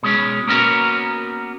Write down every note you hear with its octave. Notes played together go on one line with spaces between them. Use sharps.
B2 G#3 C#4
A#3 B3 C#4 F#4 A#4